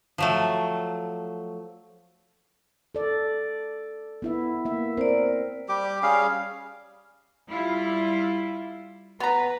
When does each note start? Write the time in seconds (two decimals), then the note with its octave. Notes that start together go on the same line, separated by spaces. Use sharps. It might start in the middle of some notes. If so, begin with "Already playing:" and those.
0.18 F3 F#3 A3
2.95 A4 D5
4.22 B3 E4 E5
4.65 A#3 E5
4.98 C4 A#4 C5 D5
5.69 G3 G4 D6
6.03 G3 C#4 G#4 F5
7.49 G3 E4 F4
9.20 B3 B4 A#5